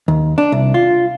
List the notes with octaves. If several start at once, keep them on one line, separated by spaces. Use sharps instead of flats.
D#2
D4
C2
F4